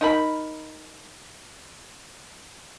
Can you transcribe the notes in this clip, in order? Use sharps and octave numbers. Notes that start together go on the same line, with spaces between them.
D#4 A#4 B5